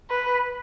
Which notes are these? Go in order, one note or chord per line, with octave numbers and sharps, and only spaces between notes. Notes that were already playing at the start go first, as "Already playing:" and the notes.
B4